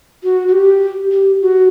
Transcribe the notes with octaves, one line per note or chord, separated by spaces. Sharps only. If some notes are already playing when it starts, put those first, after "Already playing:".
F#4
F#4
G4
G4
F#4